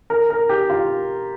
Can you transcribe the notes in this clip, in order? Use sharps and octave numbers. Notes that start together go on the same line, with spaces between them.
A#4
A#4
G4
F4